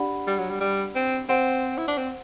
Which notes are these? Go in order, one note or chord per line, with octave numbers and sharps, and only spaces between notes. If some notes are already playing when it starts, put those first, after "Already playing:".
Already playing: D4 G4 D5 F#5 B5
G3
F#3
G3
G3
C4
C4 C5 F#5 C6
E4
D4
C4